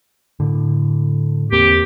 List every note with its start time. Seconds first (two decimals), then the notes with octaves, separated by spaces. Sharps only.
0.40 A2 D3
1.52 E2 A#3 C4 G4